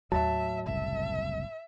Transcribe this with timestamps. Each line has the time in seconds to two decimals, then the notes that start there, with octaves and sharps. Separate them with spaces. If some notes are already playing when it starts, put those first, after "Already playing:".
0.12 D#2 A2 F#3 E5 A5
0.67 F#1 C2 E5